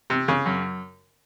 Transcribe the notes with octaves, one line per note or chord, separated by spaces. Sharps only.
C3
C#3
F#2